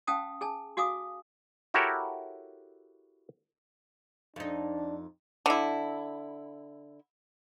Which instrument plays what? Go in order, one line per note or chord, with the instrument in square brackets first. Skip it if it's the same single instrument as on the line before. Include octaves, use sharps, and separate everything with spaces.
[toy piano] C#4 F5 G5 A5 D#6
G#4 G#5 A5
F#4 F5 G#5 D6 D#6
[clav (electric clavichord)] E4 F#4 G4 A4 A#4 C#5
[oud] F2 D#4 [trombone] D4
[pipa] D3 E4